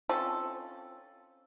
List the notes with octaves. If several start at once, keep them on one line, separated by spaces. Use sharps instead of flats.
C4 C#4 F4 A4